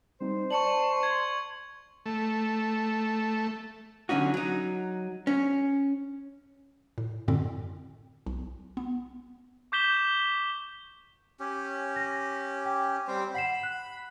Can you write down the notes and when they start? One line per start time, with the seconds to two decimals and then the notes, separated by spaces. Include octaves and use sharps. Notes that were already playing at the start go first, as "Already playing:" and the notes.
0.21 G3 C4 D#4 C5
0.51 D5 A5 C#6 C#7 F#7
1.03 C6 G#6
2.06 A3
4.09 D3 F#3 C#4 D#4 F#4
4.34 F#3 D#4
5.27 C#4
6.98 A2
7.28 F#2 A2 D3 C4
8.27 B1
8.77 B3
9.72 C#6 D6 G6 B6 E7 G7
11.40 C#4 G4
11.96 A#6
12.65 G5
13.08 G3 C4 C5
13.34 F#5 B5 C7 E7
13.63 F#6